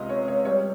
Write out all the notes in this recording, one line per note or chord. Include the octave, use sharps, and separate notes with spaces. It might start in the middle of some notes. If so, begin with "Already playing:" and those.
Already playing: C#2 C3 D#5 F5 C6
C#5
C#5
G3 C#5